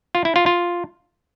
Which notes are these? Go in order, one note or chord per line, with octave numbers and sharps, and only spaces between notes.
F4
E4
F4
F4